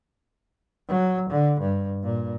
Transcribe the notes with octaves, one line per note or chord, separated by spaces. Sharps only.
F#3
D3
G2
A#2